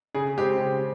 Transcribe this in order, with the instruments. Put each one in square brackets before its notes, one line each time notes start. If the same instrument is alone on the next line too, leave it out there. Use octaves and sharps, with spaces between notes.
[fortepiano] C#3 [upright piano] G#4
[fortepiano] G#3 C4 [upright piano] G4
[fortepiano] C#3